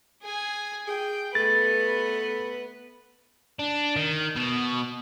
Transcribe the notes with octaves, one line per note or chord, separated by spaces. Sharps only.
G#4 G#5
G#4 G5
A3 B3 B4 A6
D4
D#3
B2